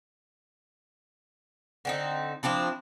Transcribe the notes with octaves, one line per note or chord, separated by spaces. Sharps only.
D3 C4 D#4
F3 C4 D4 E4